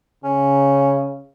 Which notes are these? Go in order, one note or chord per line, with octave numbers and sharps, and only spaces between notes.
C#3 C#4